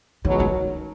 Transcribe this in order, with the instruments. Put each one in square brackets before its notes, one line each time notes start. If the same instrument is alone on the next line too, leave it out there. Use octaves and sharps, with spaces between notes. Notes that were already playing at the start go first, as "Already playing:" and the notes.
[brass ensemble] C#2 B2 F#3 [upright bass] D#3
[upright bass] D#3